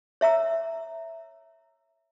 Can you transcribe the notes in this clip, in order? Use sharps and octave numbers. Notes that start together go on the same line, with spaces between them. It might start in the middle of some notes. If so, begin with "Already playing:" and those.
C#5 E5 A#5 E6